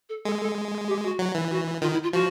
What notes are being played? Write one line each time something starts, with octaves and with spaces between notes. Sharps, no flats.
A4
G#3 A4
A4
G4
F#4
F#3
E3
F#4
D#3 F4
E4
F4
F3 F#4